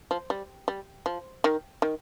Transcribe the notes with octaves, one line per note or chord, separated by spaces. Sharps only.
F3
G3
G3
F3
D#3
D#3